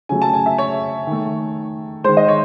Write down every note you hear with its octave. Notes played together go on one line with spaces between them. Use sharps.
C#3 F#3 A3 G#5
A5
G#5
E5
C#5
D#3 A3
D#3 G#3 C5
D#5
C#5